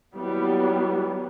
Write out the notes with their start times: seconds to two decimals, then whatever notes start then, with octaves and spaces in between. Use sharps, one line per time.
0.15 D#2 F#3 G3 B3 E4